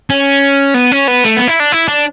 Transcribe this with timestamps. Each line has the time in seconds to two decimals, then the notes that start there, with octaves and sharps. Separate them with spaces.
0.10 C#4
0.74 B3
0.92 C#4
1.08 B3
1.24 A3
1.36 B3
1.47 E4
1.60 D4
1.72 E4
1.88 D4